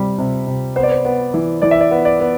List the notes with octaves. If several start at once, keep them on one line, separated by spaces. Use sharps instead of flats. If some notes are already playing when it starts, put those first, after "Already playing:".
Already playing: C3 G3
C3
C3
B3 C5
D5
C5
B3
E3
E3 D5
E5
D5
B3
D5
B3